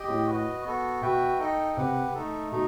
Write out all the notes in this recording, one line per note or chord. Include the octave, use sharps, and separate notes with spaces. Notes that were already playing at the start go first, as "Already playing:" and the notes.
Already playing: G4 D#5 G5
A2
F#4 B4 D#5
B3 F#4 A4
B2 F#4 B4 E5 G5
D#4 A4 D#5 G5
C3 G4 B4 F#5
A3 D#4 A4
B2 A3 D#4